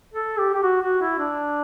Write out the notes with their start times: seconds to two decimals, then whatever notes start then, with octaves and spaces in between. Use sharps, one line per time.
0.14 A4
0.38 G4
0.53 G4
0.63 F#4
0.82 F#4
1.01 E4
1.19 D4